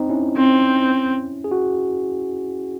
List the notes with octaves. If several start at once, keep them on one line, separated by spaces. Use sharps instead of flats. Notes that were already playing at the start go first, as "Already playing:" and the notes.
Already playing: C4 D#4
C#4 E4
C4
G#4
F#4